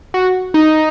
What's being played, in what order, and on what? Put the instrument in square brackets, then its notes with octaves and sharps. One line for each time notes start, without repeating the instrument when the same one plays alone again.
[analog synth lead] F#4
D#4